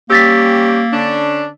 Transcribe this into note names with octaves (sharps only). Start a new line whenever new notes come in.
G3 A#3 C#4 G4 E6 A6 B6
D3 C#4 D4